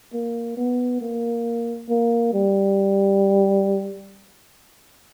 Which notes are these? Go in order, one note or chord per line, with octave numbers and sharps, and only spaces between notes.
A#3
B3
A#3
A#3
G3